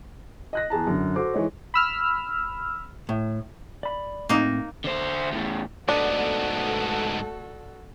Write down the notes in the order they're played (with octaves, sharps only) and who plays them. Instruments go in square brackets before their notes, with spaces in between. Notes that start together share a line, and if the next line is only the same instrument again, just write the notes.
[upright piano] D#5 F#6 A#6
E2 G#4 A5 A#5
F#2 D3
F#4 A4 C5 D6
E3 G#3 D#4 C#5
[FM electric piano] B5 E6 F6
[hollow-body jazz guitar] A2
[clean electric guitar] D5 B5
[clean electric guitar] A2 C4 [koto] A#3 D#4
[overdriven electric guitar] D3 C5
E2 A2
[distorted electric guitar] G#2 B3 [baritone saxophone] A3 [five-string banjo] D4 [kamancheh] F#4 A4